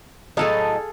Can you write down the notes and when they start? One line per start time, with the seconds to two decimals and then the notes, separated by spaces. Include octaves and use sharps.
0.37 A2 F#3 G#4 A4 D#5 F5